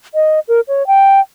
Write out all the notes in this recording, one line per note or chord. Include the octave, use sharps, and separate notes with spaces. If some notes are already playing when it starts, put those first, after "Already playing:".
D#5
A#4
C#5
G5